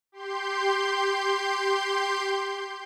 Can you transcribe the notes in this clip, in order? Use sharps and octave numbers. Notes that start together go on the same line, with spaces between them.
G4 C6 G6